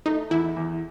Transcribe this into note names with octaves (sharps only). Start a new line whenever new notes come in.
A3 D#4
E2 E4
E2